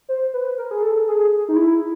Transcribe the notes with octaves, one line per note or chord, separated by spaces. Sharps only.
C5
B4
A#4
G#4
A4
G#4
D#4
E4